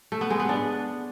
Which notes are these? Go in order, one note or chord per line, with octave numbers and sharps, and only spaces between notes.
A3
B3
G#3
B3
D4